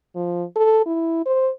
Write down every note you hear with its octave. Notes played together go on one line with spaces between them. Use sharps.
F3
A4
E4
C5